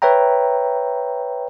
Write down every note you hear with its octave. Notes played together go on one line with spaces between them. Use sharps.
B4 C#5 E5 G5 A#5